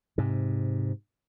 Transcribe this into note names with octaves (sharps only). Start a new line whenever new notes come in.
G#2 C3